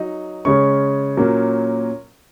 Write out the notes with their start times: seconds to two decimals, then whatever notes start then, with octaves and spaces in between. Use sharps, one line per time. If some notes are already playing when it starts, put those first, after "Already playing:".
Already playing: F#3 D#4
0.45 C#3 G#3 C#4 C#6
1.17 A#2 F#3 A#3 C#4